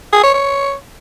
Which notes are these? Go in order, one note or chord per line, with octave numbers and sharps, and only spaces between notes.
G#4
C#5
C#5